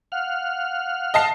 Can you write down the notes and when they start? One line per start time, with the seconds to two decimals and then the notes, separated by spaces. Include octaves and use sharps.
0.12 F5 F#5 F6
1.14 D#5 A5 C7